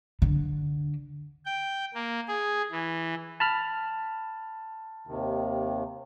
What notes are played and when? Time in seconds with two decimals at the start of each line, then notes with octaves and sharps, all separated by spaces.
0.22 D3
1.46 G5
1.94 A#3
2.28 G#4
2.71 E3
3.40 A5 B5 F6
5.07 D#2 C3 D#3